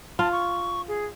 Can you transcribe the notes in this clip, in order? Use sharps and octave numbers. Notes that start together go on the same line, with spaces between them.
F4 A5
C#6
G#4